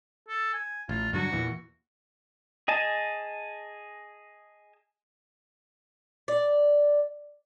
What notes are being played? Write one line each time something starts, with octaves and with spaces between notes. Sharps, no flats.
A4
G#5
A1 F4
G2 D3 F#3 F#4
E2 A#2 E3
G#4 D#5 G#5 A5
D5